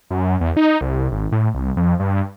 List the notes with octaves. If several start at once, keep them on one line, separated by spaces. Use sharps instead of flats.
F#2
E2
D#4
C2
G#1
A2
C2
F2
G2